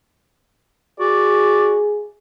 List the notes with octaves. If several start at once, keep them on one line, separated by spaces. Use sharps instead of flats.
F#4 G#4 D5